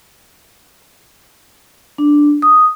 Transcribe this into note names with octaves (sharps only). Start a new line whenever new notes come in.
D4
D#6